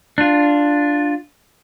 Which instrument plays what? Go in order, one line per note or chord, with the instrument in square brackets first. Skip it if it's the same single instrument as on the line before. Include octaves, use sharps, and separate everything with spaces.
[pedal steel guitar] D4 F4